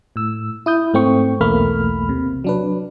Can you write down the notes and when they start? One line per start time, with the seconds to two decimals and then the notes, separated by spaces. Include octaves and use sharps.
0.16 A2 E6
0.66 E4 D#6 G6
0.94 G#2 A3 C4 G5 C#6
1.41 B1 E2 A3 A#3 B5 F6
2.09 C3
2.44 F#3 D4 B4